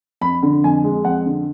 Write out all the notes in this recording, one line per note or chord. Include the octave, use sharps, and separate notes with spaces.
F2 B5
D3
F2 G#5
G#3
F2 F#5
D3